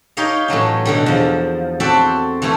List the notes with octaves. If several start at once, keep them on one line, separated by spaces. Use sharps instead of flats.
D#4 G4 C#5 D#5 F5
A2 E3 F#3 C#4
B2 D3 G3
E2 F3
C4 F#4 A4 C5 D5 E5
E3 G3 A3 E4